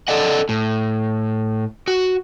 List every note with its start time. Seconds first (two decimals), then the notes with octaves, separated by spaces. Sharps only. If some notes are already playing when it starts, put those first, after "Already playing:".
0.08 A4 D5 D#5 F#5
0.49 A2
1.88 F#4